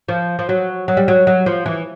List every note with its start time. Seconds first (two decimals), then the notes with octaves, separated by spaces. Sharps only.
0.09 F3
0.39 F3
0.49 F#3
0.88 F#3
0.97 G3
1.08 F#3
1.27 F#3
1.46 F3
1.66 E3